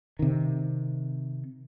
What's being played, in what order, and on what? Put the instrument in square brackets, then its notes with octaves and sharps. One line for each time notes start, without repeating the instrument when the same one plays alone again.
[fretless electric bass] C3 D#3